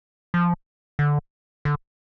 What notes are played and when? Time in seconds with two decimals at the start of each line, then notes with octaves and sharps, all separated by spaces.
0.34 F3
0.99 D3
1.65 D3